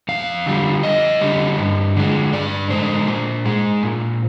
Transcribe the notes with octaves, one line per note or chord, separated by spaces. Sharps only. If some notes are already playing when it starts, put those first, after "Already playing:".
F2 F5
D3 G3
F2 D#5
D3 G3
G2
D3 G#3
G2 D5
D3 G#3 C5
A#2
G#3
A#2